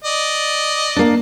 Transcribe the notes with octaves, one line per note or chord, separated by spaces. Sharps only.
D5 D#5
A#3 D4